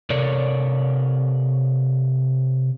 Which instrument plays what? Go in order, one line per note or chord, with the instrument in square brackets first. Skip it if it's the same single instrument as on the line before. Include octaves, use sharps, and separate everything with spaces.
[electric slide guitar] C3 A4 A#4 C#5 D5